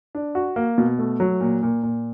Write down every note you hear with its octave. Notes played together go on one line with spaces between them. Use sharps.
D4
F#4
A#3
B2
A3
F#3
A#2
A#2
A#2